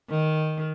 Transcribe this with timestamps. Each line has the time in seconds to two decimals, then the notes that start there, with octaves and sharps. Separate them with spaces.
0.10 D#3